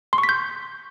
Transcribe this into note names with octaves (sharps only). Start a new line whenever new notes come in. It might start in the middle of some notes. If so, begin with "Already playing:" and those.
C6
C#6
B6
G6